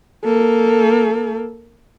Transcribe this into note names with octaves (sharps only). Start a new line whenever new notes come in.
A#3 A4